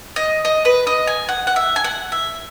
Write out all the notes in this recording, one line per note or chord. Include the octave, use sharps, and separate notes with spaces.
D#5
D#5
B4
D#5
G#5
F#5
F#5
E5
G#5
F#5
E5